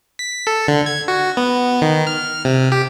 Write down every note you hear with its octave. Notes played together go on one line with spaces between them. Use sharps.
B6
A4
D3
G#6
F#4
B3
D#3
F6
C3
G4